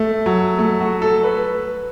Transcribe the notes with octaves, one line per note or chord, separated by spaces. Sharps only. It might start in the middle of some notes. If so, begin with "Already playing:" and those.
Already playing: A3
F#3
A3
F#4
A4
B4